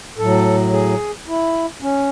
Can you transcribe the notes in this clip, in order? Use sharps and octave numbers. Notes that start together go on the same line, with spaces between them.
A2 F#3 A4
G#4
E4
C#4